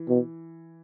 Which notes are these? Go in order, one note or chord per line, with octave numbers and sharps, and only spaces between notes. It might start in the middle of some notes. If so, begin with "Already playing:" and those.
Already playing: E3
B2